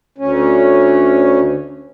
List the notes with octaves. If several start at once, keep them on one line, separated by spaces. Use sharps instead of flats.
D2 C#4